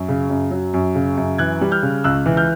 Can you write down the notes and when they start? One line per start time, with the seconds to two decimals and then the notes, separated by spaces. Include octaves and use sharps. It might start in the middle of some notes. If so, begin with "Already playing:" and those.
Already playing: F#2
0.08 C#3
0.30 F#2
0.51 F#3
0.74 F#2
0.95 C#3
1.17 F#2
1.38 E3 F#6 G#6
1.61 G3
1.72 F6 G6
1.83 C#3
2.04 C#2 E6 F#6
2.26 E3
2.37 F6 G6